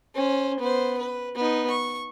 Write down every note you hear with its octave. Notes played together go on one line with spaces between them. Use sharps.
C#4 C5
B3 C5
B4
B3 D#4
C#6